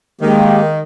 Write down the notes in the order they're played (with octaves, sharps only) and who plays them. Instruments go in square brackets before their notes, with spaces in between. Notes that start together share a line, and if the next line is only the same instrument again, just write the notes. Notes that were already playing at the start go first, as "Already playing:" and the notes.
[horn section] D#3 [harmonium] G#3 A#3 G4